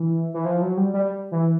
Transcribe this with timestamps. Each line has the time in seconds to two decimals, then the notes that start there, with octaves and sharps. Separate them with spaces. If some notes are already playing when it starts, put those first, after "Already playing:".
Already playing: E3
0.34 E3
0.45 F3
0.62 F#3
0.77 G3
0.94 G3
1.32 E3